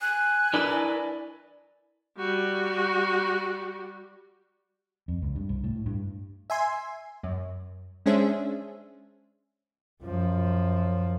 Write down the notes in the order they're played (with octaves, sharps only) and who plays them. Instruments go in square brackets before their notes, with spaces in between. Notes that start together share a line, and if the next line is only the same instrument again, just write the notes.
[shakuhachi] G#5 [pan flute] F#6
[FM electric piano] D4 A6 [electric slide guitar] E4 A#4 B4
[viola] G3 F#4
[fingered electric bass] F2
C#2
G2
C2
A2
G2
[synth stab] E5 G#5 C6
F#2
G#3 C#4 D4 G#4 C5 E5
[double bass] F#2 F3